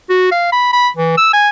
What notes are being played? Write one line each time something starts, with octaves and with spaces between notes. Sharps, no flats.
F#4
F5
B5
B5
E3
E6
G#5